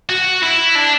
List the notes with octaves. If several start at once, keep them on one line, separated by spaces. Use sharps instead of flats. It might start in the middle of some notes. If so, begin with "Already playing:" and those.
F#4
E4
D4